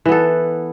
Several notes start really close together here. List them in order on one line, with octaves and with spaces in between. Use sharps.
E3 B3 A4